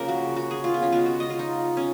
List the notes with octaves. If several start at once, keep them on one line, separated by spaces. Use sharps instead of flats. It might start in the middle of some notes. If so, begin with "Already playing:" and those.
Already playing: C#3 F3 A#3 A#4
F#4
F#4
G#4
F4
B3
C#4
C#3 G#3 B3 F4
F#4
D#5
F4
D#4
C#4